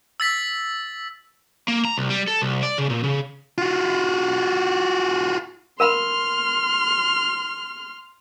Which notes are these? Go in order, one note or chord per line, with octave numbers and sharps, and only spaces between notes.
E6 A6 B6
A#3
A#5
C2
G3
A4
C2
D5
C#3
A#2
C#3
F4 F#4
A#4 F5 B5 C6 F6